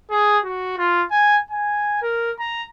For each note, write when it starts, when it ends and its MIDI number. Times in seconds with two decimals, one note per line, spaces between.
0.11 0.38 68
0.45 0.77 66
0.78 1.04 65
1.11 1.39 80
1.51 1.97 80
2.02 2.32 70
2.39 2.66 82